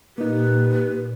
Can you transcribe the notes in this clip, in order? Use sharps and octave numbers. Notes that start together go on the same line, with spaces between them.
A#2 A#3 D#4 G4 B4